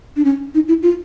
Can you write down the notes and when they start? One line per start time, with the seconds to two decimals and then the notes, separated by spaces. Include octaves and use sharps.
0.16 D4
0.25 C#4
0.55 D#4
0.68 E4
0.83 F4